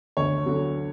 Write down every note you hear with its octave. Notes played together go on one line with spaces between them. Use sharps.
D2 C#5
D3 F#3